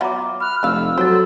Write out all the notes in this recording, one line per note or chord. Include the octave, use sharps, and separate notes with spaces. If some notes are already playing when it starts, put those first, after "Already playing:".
F#3 B3 F4 E5 A#5 D6
B5 F6 F#6
F1 A3 F5 E6
F#3 F#4 A4 C5 A6